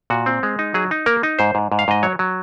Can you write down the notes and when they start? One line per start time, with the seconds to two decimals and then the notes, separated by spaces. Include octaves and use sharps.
0.10 A#2 F#4
0.26 C4
0.43 G#3
0.59 D#4
0.74 F#3 G#4
0.91 D#4
1.06 A#3 A#4
1.23 D#4
1.39 G#2 C5
1.55 G#2
1.72 G#2
1.79 F5
1.88 G#2 D#5
2.03 F#3 C#5
2.19 F#3